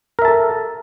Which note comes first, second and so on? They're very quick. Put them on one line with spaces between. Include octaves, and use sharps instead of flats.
A#4 E5 A5 A4